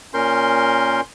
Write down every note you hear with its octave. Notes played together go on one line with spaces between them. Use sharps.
A#2 C#4 A#4 C6 G6